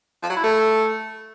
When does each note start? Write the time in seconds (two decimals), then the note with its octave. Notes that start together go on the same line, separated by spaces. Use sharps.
0.23 F3
0.30 F#3
0.37 E4
0.44 A3